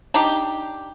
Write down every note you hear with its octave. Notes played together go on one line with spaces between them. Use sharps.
D4 D#4 G4